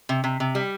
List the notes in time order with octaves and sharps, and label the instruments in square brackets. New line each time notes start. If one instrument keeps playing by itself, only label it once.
[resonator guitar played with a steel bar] C3
C3
C3
G3